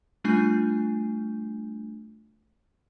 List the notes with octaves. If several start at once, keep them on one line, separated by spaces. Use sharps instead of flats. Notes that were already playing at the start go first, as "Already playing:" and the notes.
G3 A3 D4 F4 G#5 G6